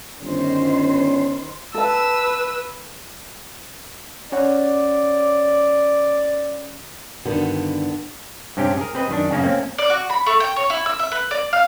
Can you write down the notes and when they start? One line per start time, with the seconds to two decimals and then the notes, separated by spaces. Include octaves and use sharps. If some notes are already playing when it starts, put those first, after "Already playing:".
0.22 G1 D#3 C#4 C5
1.74 A4 B4 A5 E6
4.32 C#4 C#5 D5 F#5
7.25 G2 D3 D#3 B3 F#4
8.57 G2 C3 C#4 G4 G5
8.77 G#4 A#4
8.95 C4 B4 D#5
9.09 F#2 D#3 D4
9.31 F#2 C#3 A#3 C#4
9.43 A3 A#3 C4 C#4
9.78 D5
9.90 F#4
10.10 B5
10.26 A3
10.40 G5
10.56 C#5
10.70 E4
10.86 E6
10.99 E5
11.12 B4
11.31 D5
11.53 F5